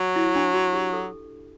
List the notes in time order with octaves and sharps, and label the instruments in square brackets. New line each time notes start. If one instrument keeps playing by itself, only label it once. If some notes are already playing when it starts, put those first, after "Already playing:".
Already playing: [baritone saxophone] F#3
[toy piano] E4
D4
F#4
G4
A4